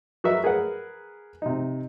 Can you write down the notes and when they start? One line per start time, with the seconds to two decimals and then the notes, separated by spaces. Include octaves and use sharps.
0.24 F#3 F#4 A#4 B4 D#5 E5
0.44 G#4 A#4 B4 F#5
1.42 C3 D#4